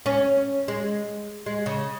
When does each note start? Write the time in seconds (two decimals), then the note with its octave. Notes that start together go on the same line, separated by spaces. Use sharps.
0.06 C#4
0.68 G#3
1.46 G#3
1.66 C#3